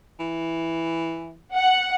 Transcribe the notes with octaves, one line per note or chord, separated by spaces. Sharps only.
E3
F#5